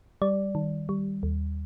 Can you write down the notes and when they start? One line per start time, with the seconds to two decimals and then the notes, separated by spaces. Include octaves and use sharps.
0.22 G3 D5
0.55 D#3
0.89 G3
1.23 D#2